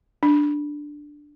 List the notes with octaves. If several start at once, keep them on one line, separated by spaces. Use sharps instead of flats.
D4